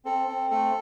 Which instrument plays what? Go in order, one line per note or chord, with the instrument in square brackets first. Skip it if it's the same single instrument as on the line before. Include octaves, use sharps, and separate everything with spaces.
[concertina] C4 A4
C4
A3 A4